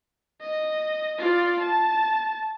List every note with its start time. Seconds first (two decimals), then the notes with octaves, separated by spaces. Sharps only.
0.41 D#5
1.18 F4 D5
1.59 A5